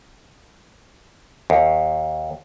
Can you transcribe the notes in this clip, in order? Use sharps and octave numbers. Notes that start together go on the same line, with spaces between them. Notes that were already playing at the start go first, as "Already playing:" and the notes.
D#2